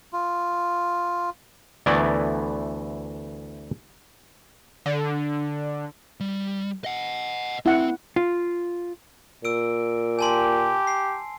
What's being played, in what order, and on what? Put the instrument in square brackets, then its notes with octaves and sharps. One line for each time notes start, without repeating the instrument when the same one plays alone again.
[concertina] F4
[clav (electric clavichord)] D2 E3 A3 B3 E4 D5
[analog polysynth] D3
[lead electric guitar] G3
D#5 F#5
[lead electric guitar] C4 [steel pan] E4 F#5
[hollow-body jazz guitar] F4
[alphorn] A#2 [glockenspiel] E6 D7
[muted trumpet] G4 [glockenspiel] G#5 A5 C6
[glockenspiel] C7